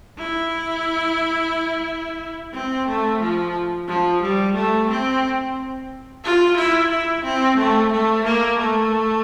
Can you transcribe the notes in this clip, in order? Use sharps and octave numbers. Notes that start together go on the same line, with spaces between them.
E4
C4
A3
F3
F3
G3
A3
C4
F4
E4
E4
C4
A3
A3
A#3
A3